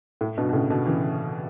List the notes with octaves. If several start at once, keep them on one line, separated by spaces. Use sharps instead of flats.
A2
G2 B2
B2
A2 C#3
B2 D3
C#3 E3